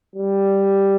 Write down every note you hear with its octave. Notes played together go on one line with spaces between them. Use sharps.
G3